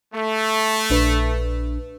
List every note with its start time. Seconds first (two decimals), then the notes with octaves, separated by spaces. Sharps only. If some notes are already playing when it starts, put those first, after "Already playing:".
0.14 A3
0.90 A#1 D4 B4